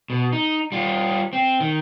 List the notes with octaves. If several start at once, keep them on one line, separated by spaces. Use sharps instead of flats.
B2
D#4
G3 F4
C4
D#3